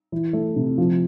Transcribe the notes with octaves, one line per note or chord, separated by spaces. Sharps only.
E3
A3
C3
F3